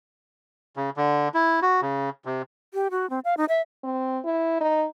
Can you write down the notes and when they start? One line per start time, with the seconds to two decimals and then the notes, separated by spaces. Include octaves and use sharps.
0.77 C#3
0.97 D3
1.34 E4
1.62 F#4
1.81 C#3
2.25 C3
2.74 G4
2.91 F#4
3.10 C4
3.25 F5
3.37 D#4
3.49 E5
3.84 C4
4.25 E4
4.61 D#4